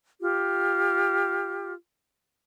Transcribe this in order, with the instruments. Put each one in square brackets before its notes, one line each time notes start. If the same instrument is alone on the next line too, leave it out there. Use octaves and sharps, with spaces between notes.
[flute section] F4 G4